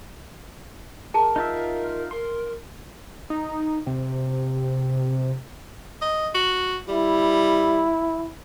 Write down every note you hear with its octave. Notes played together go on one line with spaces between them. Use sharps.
G#4 A#4 A5 A#5
D#4 F4 E5
A#4 C6
D#4
C3
D#5
F#4
G3 E4